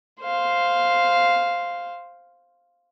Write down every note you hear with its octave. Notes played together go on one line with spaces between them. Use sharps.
C5 F5